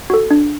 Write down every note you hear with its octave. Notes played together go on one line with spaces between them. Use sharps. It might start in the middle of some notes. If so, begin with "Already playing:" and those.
F#4 A4
D4